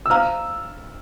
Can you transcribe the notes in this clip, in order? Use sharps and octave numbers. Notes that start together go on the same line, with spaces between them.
E6
C5 F5 A#5 F6